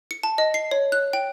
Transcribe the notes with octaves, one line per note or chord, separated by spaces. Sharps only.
C#7
A5
D#5
C7
C#5
F#6
G5